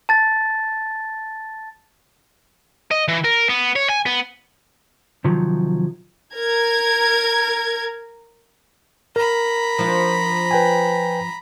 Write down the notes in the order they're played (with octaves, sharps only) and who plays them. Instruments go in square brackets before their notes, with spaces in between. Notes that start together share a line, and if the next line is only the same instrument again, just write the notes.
[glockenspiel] A5 A6
[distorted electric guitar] D#5
E3
A#4
B3
C#5
G#5
B3
[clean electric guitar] C3 D#3 F3 F#3
[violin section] A#4 G#6
[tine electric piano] A#4 [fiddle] A#5 B5
[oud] F3 D4 F4
[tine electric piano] B4 G5 G#5